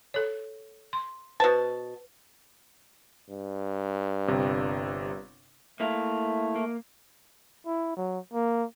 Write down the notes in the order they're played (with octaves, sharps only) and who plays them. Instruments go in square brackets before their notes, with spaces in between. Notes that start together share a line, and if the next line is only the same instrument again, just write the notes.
[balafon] A4 C#5
C6
[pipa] B2 A5 [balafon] B4 C5
[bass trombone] G2
[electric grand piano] G1 C3
[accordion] A3 [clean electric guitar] A#3 E4 F5
[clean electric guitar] A#3
[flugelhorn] E4
F#3
A#3